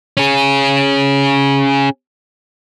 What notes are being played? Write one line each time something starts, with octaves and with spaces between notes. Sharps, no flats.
C#4 G#4